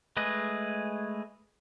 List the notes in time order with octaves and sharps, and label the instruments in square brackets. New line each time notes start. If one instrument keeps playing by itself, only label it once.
[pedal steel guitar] G#3 A3 G#4 B4 D#5